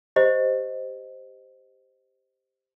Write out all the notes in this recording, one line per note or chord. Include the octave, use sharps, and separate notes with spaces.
G4 C5 D#5